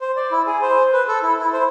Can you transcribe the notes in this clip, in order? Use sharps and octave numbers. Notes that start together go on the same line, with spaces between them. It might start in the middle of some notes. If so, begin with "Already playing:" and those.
C5
D5
E4
G#4
C5
B4
A4
E4
E4
C5